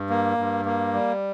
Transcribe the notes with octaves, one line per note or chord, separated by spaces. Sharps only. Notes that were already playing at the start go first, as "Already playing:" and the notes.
Already playing: G2
A#3
G2
A#3
G3